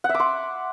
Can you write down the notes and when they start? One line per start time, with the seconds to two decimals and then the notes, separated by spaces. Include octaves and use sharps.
0.04 F#5
0.09 E5
0.15 D6
0.20 C6